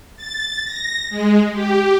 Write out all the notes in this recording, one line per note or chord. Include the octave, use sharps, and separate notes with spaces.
A6
A#6
G#3
G4